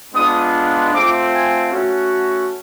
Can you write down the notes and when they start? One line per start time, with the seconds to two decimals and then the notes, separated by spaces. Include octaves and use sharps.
0.13 G#3 B3 D4 F4 D#6
0.92 A3 C4 F4 D6
1.32 G#5
1.71 A3 C#4 F#4